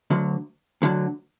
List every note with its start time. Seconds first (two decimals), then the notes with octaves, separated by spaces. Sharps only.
0.10 D2 D3 F#3
0.82 D2 D3 F#3